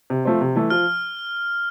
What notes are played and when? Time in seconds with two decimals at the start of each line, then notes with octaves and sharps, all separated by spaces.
0.10 C3
0.25 F3 A3 C4
0.41 C3
0.56 E3 A3
0.70 F3 F6